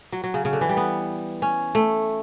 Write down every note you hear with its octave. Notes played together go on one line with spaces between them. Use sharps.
F#3
F#3
C#3
C#3
D3
E3
G3
B3
C#4
A3